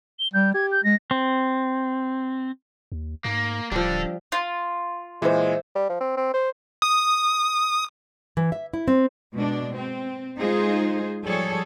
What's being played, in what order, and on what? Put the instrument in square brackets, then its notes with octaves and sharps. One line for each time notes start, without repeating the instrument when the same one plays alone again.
[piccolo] G7
[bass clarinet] G3 [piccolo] G6
[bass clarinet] G4 [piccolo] G#6
[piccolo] G6
[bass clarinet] G#3 [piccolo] A#6
[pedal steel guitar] C4
[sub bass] D#2
[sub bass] G#2 [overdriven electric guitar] A#3
[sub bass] D1 [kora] F3 G3 [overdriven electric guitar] D4 A4
[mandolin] F4
[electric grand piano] A#2 E3 [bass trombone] G#3 [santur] C5 E5
[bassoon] G3
F3
C4
C4
C5
[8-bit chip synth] D#6
[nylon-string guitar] E3
E5
E4
C4
[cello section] B2 G#3 D4
C4
G#3 D#4 F4 G#4 C5
F3 G3 G#4 A4 C#5